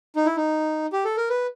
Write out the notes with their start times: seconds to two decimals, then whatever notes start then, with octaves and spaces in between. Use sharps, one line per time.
0.16 D#4
0.26 E4
0.37 D#4
0.93 G4
1.05 A4
1.17 A#4
1.30 B4